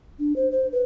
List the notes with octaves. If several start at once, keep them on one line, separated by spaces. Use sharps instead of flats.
D4
C5
C5
B4